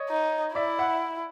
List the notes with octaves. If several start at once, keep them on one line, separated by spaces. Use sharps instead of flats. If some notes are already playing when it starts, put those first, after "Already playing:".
Already playing: C#5 D#5
D#4
E4 D5 E5
E5 F#5